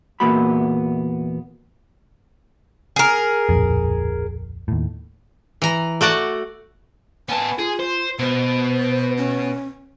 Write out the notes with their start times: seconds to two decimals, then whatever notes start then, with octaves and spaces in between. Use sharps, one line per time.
0.20 E2 A#2 A#3 B3 F#4 B5
2.96 G#4 A#4
3.49 D1 A#1 F2
4.68 D#2 A2
5.62 E3 A#5
6.01 A3 F#4 D5 F#5
7.29 B3 G#5 A5
7.59 F4 G#4
7.79 C5
8.19 B2 C5
9.18 C#4